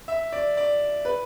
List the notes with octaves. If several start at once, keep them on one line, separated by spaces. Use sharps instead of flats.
E5
D5
D5
B4